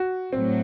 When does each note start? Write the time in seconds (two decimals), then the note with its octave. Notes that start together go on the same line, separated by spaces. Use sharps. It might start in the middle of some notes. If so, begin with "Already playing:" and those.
Already playing: F#4
0.32 A2 F#3 C4